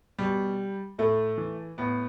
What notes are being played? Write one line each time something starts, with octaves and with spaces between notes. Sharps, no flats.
B2 G3
A2 A3
E3
A2 B3